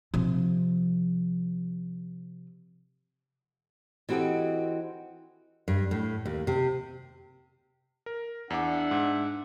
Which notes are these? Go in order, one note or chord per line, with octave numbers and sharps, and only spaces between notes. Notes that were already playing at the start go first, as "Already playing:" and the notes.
C3 F3
E3 C4 F#4 G4 A4 D#5
G2
A2
D#2
C3
A#4
E2 D4 E5 F#5 D6
G#2